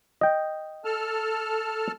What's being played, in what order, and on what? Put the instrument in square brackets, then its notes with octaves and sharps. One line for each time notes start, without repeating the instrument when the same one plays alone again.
[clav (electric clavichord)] D#5 G5
[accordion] A4 A5 F6